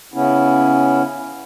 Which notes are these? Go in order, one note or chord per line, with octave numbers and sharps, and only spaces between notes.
C#3 B3 C#4 E4